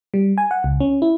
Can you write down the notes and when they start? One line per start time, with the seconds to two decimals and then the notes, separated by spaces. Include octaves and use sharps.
0.14 G3
0.38 G#5
0.51 F#5
0.64 C#2
0.80 C#4
1.02 E4